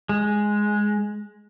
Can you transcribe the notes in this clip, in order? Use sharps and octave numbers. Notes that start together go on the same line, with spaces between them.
G#3